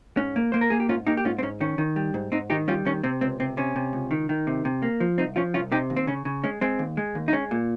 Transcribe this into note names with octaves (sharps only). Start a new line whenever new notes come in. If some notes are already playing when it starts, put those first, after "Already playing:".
G#2 C#4
A#3
A#3 C5
A#4
A#3 G#4
G4
G#2 C#4 F4
A#3 D#4 G4
G4
G#2 C#4 F4
C4
G#2 C#4
D#3 C#4
D#3
G3
G#2
G#2 C4 D#4
D#3 D#4 G4
G3 C#4 F4
D#3 C#4
C3 C4
C#2 C4
C3 C4
C3 C#4
C3
C#2
D#3
D#3
C3
C3
A#3
F3
C2 C4 D#4
F3 C#4 F4
C2 C#4 F4
C3 D#4 G4
D#2
C4
C#3 C#4
C#3
G#3 C#4
G#3 C4
D#2
G#3
D#2
D#4
G#3 C#4
A#2